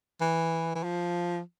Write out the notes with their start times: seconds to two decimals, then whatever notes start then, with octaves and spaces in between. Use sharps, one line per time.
0.21 E3
0.75 E3
0.83 F3